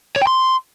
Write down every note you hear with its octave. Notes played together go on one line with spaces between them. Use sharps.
C#5
G5
C6